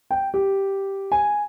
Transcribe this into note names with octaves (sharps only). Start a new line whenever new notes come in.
G5
G4
G#5